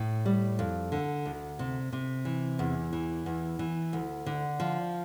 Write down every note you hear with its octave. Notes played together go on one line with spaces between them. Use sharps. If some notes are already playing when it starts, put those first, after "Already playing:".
Already playing: A2
G3
F2
D3
D2
C3
C3
E3
E2
E3
E2
E3
D2
D3
F3